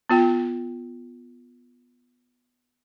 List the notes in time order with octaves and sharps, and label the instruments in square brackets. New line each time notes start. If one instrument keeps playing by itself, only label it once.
[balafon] B3 F4 G5